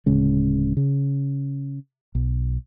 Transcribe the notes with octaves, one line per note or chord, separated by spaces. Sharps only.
D1 C#3 G#3
C#3
B1